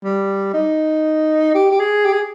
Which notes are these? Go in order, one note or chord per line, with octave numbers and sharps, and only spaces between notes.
G3
D#4
G4
G4
G#4
G4
G#4